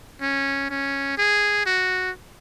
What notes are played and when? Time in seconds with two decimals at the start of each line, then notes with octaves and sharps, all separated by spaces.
0.21 C#4
0.70 C#4
1.18 G#4
1.66 F#4